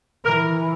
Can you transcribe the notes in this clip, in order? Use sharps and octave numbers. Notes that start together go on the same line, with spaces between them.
E3 A#4